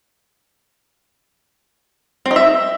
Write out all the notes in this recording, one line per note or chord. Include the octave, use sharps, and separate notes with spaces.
C4
D#4
E5